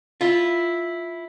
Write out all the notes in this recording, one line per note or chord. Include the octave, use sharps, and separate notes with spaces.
E4 F4